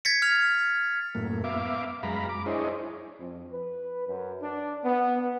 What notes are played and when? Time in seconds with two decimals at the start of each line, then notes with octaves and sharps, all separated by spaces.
0.05 G#6 A6 B6 C#7
0.22 F6 G#6 F7
1.15 F#2 A2 A#3
1.44 B3 E5 F5 D6
2.03 F#2 G#3 F5 A#5 B5
2.29 D6
2.46 D4 E4 G#4 C5 C#5 D#5
3.19 F2
3.52 B4
4.08 F#2
4.41 D4
4.84 B3